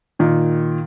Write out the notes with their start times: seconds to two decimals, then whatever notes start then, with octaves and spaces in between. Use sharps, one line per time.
0.19 A#2 D#3